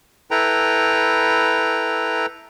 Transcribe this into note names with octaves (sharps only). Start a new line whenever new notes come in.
E4 A4 B4 G5 A#5